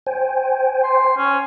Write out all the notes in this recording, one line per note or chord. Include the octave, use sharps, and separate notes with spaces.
C5 G5 G#5
C6
C#4